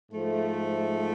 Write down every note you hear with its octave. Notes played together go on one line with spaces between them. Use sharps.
G#2 F3 A3